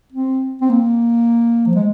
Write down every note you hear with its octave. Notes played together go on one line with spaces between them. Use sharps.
C4
C4
A#3
F3
G#3